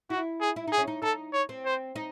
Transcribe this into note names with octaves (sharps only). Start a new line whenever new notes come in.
E4 F#4
G#4
E4
D#4 G#4
C#4
D#4
D#4 A4
C#5
C4
C5
D#4